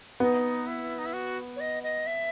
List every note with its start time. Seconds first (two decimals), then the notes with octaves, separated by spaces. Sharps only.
0.20 B3 D#4
0.67 E4
0.98 D#4
1.06 E4
1.13 F#4
1.56 C#5
1.60 D#5
1.83 D#5
2.06 E5